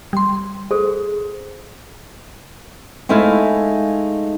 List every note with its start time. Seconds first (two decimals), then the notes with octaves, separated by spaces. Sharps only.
0.13 G3 C6
0.71 G#4 A4 C5
3.09 G#3 A3 D#4 E4 E5 F5